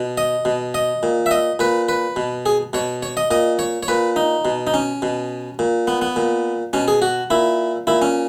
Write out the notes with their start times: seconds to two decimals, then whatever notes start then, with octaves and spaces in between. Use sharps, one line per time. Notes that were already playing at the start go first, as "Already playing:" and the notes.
Already playing: B2
0.17 D#5
0.45 B2
0.74 D#5
1.03 A#2
1.26 E5
1.31 D#5
1.59 A#2 B4
1.89 B4
2.16 B2
2.46 G#4
2.73 B2 C#5
3.03 C#5
3.17 D#5
3.31 A#2 D#5
3.59 C#5
3.83 C#5
3.88 A#2 B4
4.16 D#4
4.45 B2
4.67 D#4
4.74 C#4
5.02 B2
5.59 A#2
5.87 B3
6.01 B3
6.16 A#2
6.73 B2 C#4
6.88 G#4
7.02 F#4
7.30 A#2 E4
7.87 A#2 E4
8.02 C#4